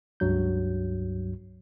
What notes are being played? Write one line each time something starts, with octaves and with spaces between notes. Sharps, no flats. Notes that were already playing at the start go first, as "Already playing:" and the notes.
C#2 G2 F#3 G6